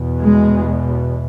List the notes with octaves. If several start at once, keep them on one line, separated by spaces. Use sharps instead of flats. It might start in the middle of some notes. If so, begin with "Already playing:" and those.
Already playing: E2 B2
G#3